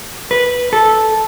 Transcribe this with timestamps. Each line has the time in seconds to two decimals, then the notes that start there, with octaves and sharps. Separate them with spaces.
0.31 B4
0.73 A4